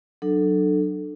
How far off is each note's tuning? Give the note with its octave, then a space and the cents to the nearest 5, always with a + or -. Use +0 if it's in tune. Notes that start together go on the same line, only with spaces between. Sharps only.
F#3 +0 D4 +30 A4 +0